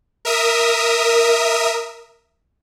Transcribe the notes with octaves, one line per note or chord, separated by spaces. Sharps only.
A#4 E5 D#6